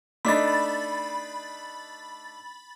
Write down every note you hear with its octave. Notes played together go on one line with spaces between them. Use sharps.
A3 D4 D#4 B5 A6